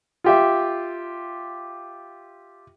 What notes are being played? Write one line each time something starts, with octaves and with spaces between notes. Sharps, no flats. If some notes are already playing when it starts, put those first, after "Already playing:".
F4 G4 E5